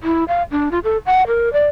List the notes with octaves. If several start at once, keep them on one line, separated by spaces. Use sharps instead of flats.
E4
F5
D4
F4
A4
F#5
A#4
D5